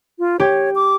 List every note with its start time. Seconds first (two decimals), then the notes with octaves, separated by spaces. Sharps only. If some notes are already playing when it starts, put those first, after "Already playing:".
0.19 F4
0.40 G4 C#5
0.75 D6